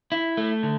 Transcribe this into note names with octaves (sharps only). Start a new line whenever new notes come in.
E4
A3
D3